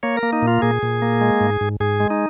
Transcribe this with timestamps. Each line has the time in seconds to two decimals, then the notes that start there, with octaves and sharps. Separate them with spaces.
0.03 A#3 C#5
0.17 A#4
0.23 A#3
0.33 D#4
0.42 A#2
0.48 F4
0.62 A#2 G#4
0.83 A#2
1.02 A#3
1.21 G#3
1.41 G#2
1.61 G#2
1.80 G#2 G#4
2.00 G#3
2.10 D#4